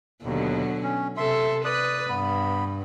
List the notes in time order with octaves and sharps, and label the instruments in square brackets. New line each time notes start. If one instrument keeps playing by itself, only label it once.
[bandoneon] D#2 [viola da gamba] B2 D3 F#3
[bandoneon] C#4
[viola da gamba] C3 A4 [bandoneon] E5 C6
[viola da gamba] B4 [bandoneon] D5 D#6 F#6
[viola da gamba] G2 [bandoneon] B3 B5